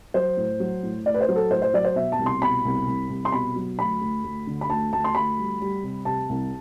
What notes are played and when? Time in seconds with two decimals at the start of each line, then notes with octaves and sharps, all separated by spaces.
0.14 F#3 C5
0.37 A2
0.60 F#3
0.83 A2
1.05 A2 D5
1.14 B4
1.21 C5
1.29 F#3
1.36 A4
1.50 A2 C5
1.62 C5
1.74 F#3 D5
1.85 C5
1.96 B2 E5
2.12 A5
2.19 C2
2.26 C6
2.41 B2 B5
2.65 C2
2.87 C2
3.10 C2
3.25 C6
3.32 B2 B5
3.56 F#3
3.78 D2 B5
4.01 D2
4.24 D2
4.47 D3
4.61 B5
4.69 D2 A5
4.92 D2 A5
5.04 C6
5.15 D2 B5
5.38 G3
5.60 G3
5.83 C3
6.05 C3 A5
6.29 C2